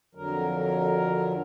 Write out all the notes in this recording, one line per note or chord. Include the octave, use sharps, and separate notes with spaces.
F2 D3 F#3 A#4